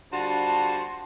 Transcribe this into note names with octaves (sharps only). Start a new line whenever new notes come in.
D3 G3 F4 F#4 C5 A5